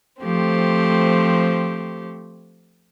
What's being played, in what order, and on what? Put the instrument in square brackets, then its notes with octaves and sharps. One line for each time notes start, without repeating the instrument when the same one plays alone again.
[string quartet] F3 A3 C4 G4